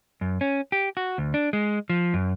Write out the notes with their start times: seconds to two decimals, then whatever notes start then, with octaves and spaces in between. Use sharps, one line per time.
0.21 F#2
0.41 C#4
0.72 G4
0.97 F#4
1.18 D2
1.34 D4
1.53 G#3
1.90 F3
2.14 F#2